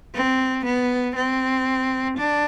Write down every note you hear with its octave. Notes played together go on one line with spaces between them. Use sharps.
C4
B3
C4
D4